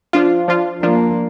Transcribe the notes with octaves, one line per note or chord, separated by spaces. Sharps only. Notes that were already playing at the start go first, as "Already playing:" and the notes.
F3 D4 F4
F3 D4 F4
F3 A#3 D4 F4